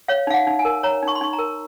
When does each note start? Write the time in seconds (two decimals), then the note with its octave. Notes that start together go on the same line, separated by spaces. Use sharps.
0.08 C#5 F5
0.27 D#4 F5
0.33 F#5
0.47 D#4
0.59 G#5
0.65 A#4
0.83 C#5 A#5
1.03 D#4 C#6
1.15 C6
1.21 D#4 C#6
1.33 A#5
1.39 A#4